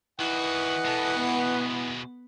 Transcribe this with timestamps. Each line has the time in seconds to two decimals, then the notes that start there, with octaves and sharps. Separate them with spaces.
0.20 D#3 E3 F#4 B4 D#5 F#5
0.85 B2 G#3 A4
1.17 B3